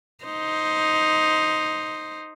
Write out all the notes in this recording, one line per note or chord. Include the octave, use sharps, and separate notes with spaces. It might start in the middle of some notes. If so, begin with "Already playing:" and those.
D#4 C5